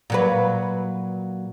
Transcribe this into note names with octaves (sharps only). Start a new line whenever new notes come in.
A#2 F#3 B4